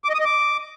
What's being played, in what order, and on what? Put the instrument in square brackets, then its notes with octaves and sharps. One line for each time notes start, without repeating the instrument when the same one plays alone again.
[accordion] D6
D#5
D#6
D#5
D6